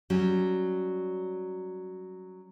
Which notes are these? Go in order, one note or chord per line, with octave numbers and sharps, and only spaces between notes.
F#3 G3 C#4